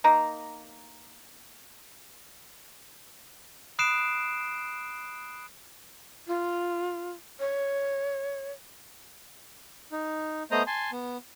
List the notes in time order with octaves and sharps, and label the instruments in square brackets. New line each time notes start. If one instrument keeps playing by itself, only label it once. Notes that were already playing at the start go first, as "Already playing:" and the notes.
[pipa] A#3 D#4 A#5
[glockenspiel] B5 D#6 F#6 C7 D7 E7
[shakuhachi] F4
C#5
[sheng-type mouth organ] D#4
A3 B3 C5 D#5 A#5 D#6
G#5 A5 C6
B3